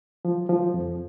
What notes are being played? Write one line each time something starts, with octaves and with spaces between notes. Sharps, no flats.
F3
F3
F2